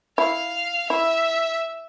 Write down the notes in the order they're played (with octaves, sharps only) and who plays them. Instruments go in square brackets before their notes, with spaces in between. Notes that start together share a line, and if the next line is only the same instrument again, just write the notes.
[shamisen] E4 [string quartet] F5
[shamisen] E4 [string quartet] E5